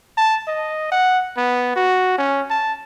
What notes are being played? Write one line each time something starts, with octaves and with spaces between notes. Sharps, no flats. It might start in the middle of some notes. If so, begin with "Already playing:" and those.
A5
D#5
F#5
B3
F#4
C#4
A5